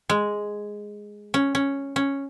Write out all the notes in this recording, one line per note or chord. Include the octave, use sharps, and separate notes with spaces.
G#3
C#4
C#4
C#4